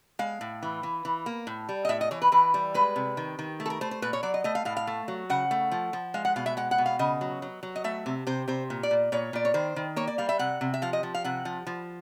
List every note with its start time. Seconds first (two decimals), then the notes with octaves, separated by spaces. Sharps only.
0.19 G#3 F5
0.41 A2
0.63 E3
0.83 E3
1.05 E3
1.26 A#3
1.47 A2
1.69 G3
1.85 D#5
1.89 A2 E5
2.01 D#5
2.11 E3 C#5
2.22 B4
2.32 E3 B4
2.54 G3
2.74 G#3 B4
2.96 C3
3.17 D#3
3.39 D#3
3.60 A3
3.66 A4
3.70 A#4
3.81 A3 C5
3.91 C5
4.02 A#2 B4
4.13 C#5
4.23 F#3 D5
4.34 D#5
4.44 A3 D#5
4.55 F5
4.65 A2 F5
4.77 F5
4.87 A3
5.08 F#3
5.30 C#3 F#5
5.51 A3
5.71 F3
5.93 F3
6.14 G#3 F5
6.25 F#5
6.36 B2 F5
6.46 E5
6.57 G#3 F#5
6.71 F#5
6.78 B2
6.86 F5
6.99 C#3 D#5
7.21 F#3
7.42 F#3
7.63 F#3
7.76 D#5
7.84 A3 E5
8.06 C3
8.27 C3 C5
8.48 C3 C5
8.70 A#2
8.83 D5
8.91 A#2
9.12 A#2 C#5
9.33 A#2 D5
9.45 C#5
9.54 D#3 C5
9.76 D#3
9.96 A#3 C#5
10.07 D5
10.18 G3 F5
10.29 E5
10.39 C3 F#5
10.61 C3
10.74 E5
10.82 F3 F5
10.93 D#5
11.03 F3
11.15 F5
11.24 C3 F#5
11.45 F3
11.67 F3